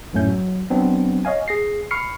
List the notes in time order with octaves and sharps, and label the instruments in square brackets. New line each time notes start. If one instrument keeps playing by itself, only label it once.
[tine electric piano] A#1 F#2 A2 A3 C#4 G6
F#3
F#3 B3 C4 D4
C#5 D#5 F5 G#5
G#4 A#6 C7
B5 C#6 F6 C7 C#7